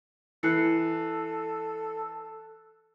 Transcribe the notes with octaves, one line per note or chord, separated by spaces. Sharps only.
E3 A4 F#6 C7 C#7